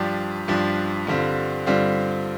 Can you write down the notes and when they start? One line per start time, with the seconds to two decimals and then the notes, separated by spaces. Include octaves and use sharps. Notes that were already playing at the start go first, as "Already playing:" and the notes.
Already playing: G2 F3 D4 G4
0.48 G2 F3 D4 G4
1.07 G2 D3 G3 C4 F4
1.66 G2 D3 G3 C4 F4